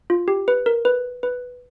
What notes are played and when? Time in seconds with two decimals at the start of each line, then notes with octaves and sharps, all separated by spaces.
0.10 F4
0.28 G4
0.48 B4
0.66 A#4
0.85 B4
1.23 B4